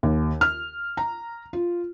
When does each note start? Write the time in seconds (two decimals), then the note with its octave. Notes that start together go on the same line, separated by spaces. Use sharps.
0.03 D#2
0.41 F6
0.97 A#5
1.53 F4